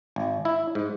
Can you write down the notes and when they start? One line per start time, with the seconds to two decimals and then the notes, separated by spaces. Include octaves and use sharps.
0.16 G#1
0.45 E4
0.75 G#2